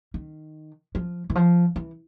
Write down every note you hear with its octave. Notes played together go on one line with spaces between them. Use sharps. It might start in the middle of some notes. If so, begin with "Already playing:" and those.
D#3
F3
E3
F3
E3